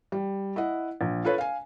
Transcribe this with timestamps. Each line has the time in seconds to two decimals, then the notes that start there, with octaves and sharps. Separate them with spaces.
0.12 G3
0.56 E4 D#5 F#5
1.01 A#1
1.25 F4 A4 B4 C#5
1.38 F5 G#5